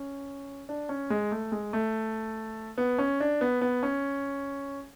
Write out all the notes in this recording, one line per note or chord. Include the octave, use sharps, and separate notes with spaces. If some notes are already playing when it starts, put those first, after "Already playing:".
Already playing: C#4
D4
C#4
G#3
A3
G#3
A3
B3
C#4
D4
B3
B3
C#4